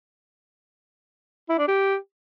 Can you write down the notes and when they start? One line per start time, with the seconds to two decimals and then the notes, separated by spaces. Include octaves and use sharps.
1.49 E4
1.59 D4
1.68 G4